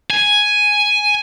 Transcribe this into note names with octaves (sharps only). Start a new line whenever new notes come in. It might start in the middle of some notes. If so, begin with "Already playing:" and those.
G#5